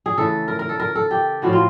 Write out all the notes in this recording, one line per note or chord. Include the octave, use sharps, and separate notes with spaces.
G#4
C#3 E3 A3 A4
A#4
A#4
A4
A#4
A4
G4
A2 F3 A#3 C#4 F#4
F4